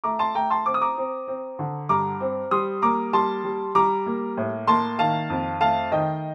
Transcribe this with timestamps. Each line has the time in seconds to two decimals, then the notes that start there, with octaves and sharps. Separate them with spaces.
0.04 A3 A#5 D6
0.19 A5 C6
0.35 A3 G5 A#5
0.50 A5 C6
0.66 C4 D6
0.74 D#6
0.81 A#5 D6
0.97 C4
1.28 C4
1.59 D3
1.89 G2 A#5 D6
2.20 C4
2.51 G3 C6 D#6
2.82 A#3 A#5 D6
3.13 G3 A5 C6
3.44 G3
3.75 G3 A#5 D6
4.06 A#3
4.37 A2
4.67 A#3 A5 C6
4.99 D#3 F5 A5
5.30 F2
5.61 A3 F5 A5
5.92 D#3 D#5 G5